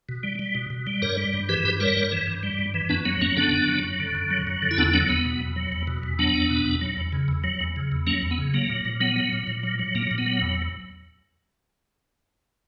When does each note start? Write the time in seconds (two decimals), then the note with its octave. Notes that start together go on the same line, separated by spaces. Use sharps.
0.09 B2
0.23 G3
0.39 G3
0.55 B2
0.70 B2
0.87 G3
1.02 G2 A#4 C#5
1.17 G3
1.33 G2
1.49 E3 G4 B4
1.64 G2 G4 B4
1.80 G3 A#4 C#5
1.96 G2
2.12 E3
2.27 G2
2.43 G3
2.59 G2
2.74 E3
2.89 F#2 B3 D4
3.05 F#3 B3
3.21 F#2 A#3 C#4
3.37 D3 B3 D4
3.52 F#2
3.68 F#3
3.84 F#2
4.00 D3
4.15 F#2
4.31 F#3
4.47 F#2
4.62 D3
4.71 E4
4.78 E2 B3 D4
4.93 F#3 B3 D4
5.09 E2 B3
5.25 B2
5.41 E2
5.56 F#3
5.72 E2
5.87 B2
6.03 E2
6.19 F#3 B3 D4
6.34 E2
6.50 B2
6.66 E2
6.81 F#3
6.97 E2
7.12 C#3
7.28 E2
7.44 F#3
7.61 E2
7.76 C#3
7.92 E2
8.07 F#3 A#3 C#4
8.22 E2
8.31 B3
8.38 C#3
8.54 F#3 A#3
8.70 A#2
8.85 A#2
9.00 F#3 B3
9.16 F#3
9.33 A#2
9.47 A#2
9.63 F#3
9.79 F#3
9.95 A#2 A#3
10.11 A#2
10.18 B3
10.26 F#3
10.41 E2